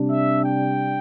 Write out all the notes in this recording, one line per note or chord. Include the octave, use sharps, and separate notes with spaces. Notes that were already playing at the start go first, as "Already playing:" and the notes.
Already playing: C3 G3 D4
E5
G5